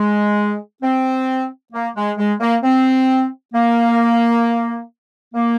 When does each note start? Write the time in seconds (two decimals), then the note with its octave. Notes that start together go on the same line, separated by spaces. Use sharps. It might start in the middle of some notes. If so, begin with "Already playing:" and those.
Already playing: G#3
0.83 C4
1.73 A#3
1.96 G#3
2.18 G#3
2.41 A#3
2.63 C4
3.54 A#3
5.34 A#3